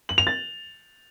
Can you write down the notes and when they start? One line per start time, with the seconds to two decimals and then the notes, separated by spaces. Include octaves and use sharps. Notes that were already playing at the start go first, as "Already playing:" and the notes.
0.09 F#7
0.18 F7
0.27 A6